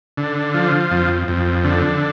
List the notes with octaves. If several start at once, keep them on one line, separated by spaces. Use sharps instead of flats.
D3
F3
F2
F2
D3